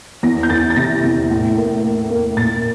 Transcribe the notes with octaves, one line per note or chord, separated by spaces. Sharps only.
E2 A#6
G6
E3 A6
A6
C3 A#6
E2
A2
A#3
A#3
A#3
A#2 A6